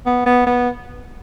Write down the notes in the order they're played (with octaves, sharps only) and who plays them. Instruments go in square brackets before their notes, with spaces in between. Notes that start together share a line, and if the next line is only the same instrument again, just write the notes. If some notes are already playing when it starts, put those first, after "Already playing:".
[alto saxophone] B3
B3
B3